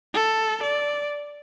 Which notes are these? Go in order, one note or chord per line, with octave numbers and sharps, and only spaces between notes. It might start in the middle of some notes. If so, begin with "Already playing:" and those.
A4
D5